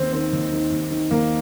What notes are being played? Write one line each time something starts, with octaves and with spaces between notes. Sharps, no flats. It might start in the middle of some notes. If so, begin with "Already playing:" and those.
Already playing: D#2 C4
D#3 C4
D#2
D#3
D#2
D#3
D#2 A#3